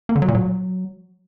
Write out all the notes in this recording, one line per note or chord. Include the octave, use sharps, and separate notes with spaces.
A#3
D3
F#3
A#2
F#3